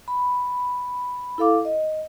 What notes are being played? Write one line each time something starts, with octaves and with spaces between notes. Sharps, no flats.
B5
E4 A4 F5 D6
D#5